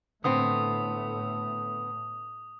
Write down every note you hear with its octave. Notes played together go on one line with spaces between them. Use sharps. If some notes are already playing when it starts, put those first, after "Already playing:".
A2 D3 A3 B3 C4 D#6